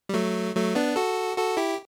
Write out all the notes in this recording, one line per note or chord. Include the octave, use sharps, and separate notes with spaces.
G3
F#3 A3
F#3 A3
B3 D4
F#4 A4
F#4 A4
E4 G4